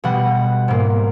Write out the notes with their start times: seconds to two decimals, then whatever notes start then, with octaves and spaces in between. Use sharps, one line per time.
0.04 B2 G3 F#5
0.68 G#2 A#3